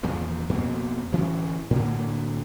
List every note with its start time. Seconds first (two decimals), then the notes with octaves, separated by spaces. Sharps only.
0.03 E2 A#2 D#3 F3
0.49 F2 B2 A#3 C4
1.12 D1 E3 C#4
1.70 A2 D3 A#3